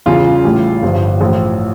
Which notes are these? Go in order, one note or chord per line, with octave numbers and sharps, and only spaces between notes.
E2 C#3 G3 F4
A1 A2 G3
G1 G2 F3
A1 A2 F3